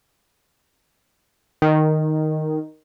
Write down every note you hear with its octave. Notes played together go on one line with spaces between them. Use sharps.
D#3